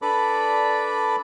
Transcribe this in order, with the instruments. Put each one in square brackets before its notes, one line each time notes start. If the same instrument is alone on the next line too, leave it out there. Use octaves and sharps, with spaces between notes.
[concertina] D4 A4 B4 D5 B5 D6